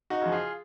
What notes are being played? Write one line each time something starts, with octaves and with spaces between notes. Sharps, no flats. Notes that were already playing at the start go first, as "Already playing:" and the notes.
D#4 F#4
C#3 F3
F4 G#4